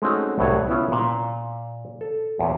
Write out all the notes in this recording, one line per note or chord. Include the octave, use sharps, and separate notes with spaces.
G#3 A3 C4 C#4 D#4 F#4
C2 A2 F#3 C#5
B3 C#4 E4 F4
A#2
A4
E2 A#2 C#5